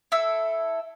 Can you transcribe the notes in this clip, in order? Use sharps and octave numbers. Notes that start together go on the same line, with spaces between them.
E4 A4 E6